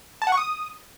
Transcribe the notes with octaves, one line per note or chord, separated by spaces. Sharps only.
A5
F#5
C#6
D#6